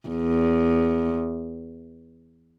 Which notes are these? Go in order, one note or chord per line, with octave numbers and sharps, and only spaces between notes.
E2